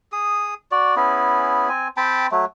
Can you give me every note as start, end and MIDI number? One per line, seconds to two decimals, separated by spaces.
0.12 0.54 68
0.12 0.54 87
0.72 0.95 66
0.72 0.95 74
0.96 1.69 59
0.96 1.69 61
0.96 1.69 64
0.96 1.69 68
1.69 1.88 60
1.69 1.88 80
1.97 2.27 60
1.97 2.27 79
1.97 2.27 81
1.97 2.27 83
2.31 2.45 54
2.31 2.45 57